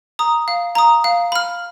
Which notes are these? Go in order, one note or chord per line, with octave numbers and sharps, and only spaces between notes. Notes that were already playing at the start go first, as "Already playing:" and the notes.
A#5 D#6
F5
A#5 D#6
F5
B5 F6